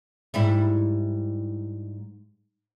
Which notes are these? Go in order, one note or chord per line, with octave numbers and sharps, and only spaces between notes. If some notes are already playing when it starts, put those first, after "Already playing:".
G#2 G3 E4